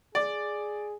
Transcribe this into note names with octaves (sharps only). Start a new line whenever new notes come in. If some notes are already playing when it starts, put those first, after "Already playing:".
G#4 D5